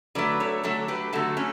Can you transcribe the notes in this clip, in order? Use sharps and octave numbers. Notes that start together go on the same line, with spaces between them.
D3 F#3 A3 B4 D5
A4 C#5
D3 F#3 A3 A4 C#5
G4 B4
D3 F#3 A3 F#4 A4
A3 C#4